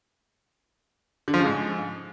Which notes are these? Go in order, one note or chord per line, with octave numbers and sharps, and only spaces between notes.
D3
F3
C#3
G#2